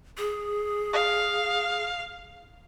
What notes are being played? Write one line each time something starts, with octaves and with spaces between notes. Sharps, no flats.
G#4
F5